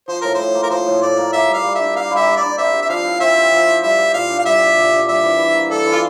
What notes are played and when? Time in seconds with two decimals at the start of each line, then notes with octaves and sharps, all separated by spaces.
0.08 F3 C5
0.21 A2 A#4
0.35 A2 C5
0.55 A#3
0.63 A#4
0.70 F3 C5
0.87 A2
1.02 A2 D5
1.18 A#3
1.33 A#3 E5
1.48 G3
1.54 F5
1.64 G3
1.75 D4 E5
1.95 A#3 F5
2.11 G3
2.16 E5
2.27 G3
2.36 D5
2.42 D4
2.58 C4 E5
2.73 G4
2.82 E5
2.89 F3 F5
3.04 E4
3.20 C4 E5
3.36 G4
3.52 F3
3.67 E4
3.82 G3 E5
3.98 G4
4.14 A#2 F5
4.29 D4
4.39 F5
4.45 G3 E5
4.61 G4
4.76 A#2
4.92 D4
5.08 G3 E5
5.23 E3
5.39 E3
5.55 A#3
5.70 G3 A4
5.86 E3
5.91 F4